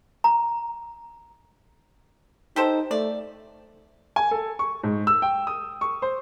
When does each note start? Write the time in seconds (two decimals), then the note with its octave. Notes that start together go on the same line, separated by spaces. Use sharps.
0.24 A#5
2.56 D#4 G4 A4 C5
2.91 A3 D5
4.16 G#5
4.31 A4
4.59 C#6
4.83 G#2
5.07 E6
5.22 G5
5.47 D#6
5.81 C#6
6.02 C5